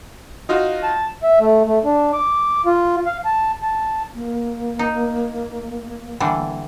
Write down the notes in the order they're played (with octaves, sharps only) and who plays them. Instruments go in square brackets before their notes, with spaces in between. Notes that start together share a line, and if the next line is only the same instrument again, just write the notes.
[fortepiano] D#4 F4 F#4
[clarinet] A5
[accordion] E5
A3
A3
D4
D6
F4
F5
A5
A5
[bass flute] A#3
[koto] D#4
D3 E3 G3